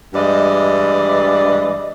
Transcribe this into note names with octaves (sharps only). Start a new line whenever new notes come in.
G2 E3 G#3 D5 D#5